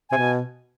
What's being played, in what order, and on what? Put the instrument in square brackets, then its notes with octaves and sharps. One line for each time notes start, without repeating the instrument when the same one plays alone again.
[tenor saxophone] C3 [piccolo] G#5
[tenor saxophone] B2